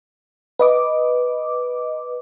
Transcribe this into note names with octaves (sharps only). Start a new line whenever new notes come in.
B4 D#5 D6